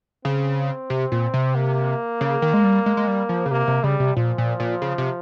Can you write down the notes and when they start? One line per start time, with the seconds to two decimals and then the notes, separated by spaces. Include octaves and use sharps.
0.25 C#3 C4
0.90 C3
1.12 A#2
1.34 C3
1.55 A#3
2.21 C#3
2.42 D#3
2.53 G#3
2.64 G3
2.86 G#3
2.97 G#3
3.07 G3
3.29 F3
3.46 C#3
3.51 C3 A#3
3.67 C3
3.84 C#3 G3
4.00 C3
4.16 A#2 F3
4.38 A#2
4.60 A#2
4.82 C#3
4.98 C3